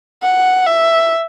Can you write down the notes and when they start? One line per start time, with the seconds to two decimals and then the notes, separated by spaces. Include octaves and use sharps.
0.22 F#5
0.66 E5